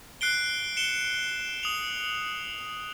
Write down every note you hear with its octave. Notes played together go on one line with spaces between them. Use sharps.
F#6 C7 D7 G7
C#7 E7 G7
D#6 F7